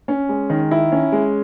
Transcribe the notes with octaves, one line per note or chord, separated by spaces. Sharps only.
C#4
G#3
D#3
E4
C#4
G#3